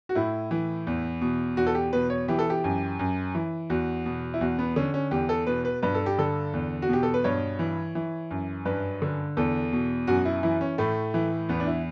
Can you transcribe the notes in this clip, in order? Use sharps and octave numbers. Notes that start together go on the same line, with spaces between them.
F#4
A2 E4
E3
E2
B2
E2 F#4
A4
G4
B2 B4
C#5
E3 G4
A4
G4
F#2
F#2
E3
E2 F#4
B2
E4
E2 F#4
B3
D3 C#4
C#4
E2 G4
A4
B2 B4
B4
G2 B4
A4
G4
D3 A4
E2
F#4
B2 G4
A4
B4
G2 C#5
E3
E3
F#2
G2 B4
D3
E2 A4
B2
F#2 F#4
E4
E3 E4
C#4
A2 A3
E3
E2 B3
D4
E4